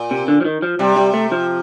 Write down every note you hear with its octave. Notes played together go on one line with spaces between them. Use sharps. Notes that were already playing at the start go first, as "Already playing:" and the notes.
Already playing: A#2
C3
D3
F3
D#3
F3
C3 G3
G3
A3
F3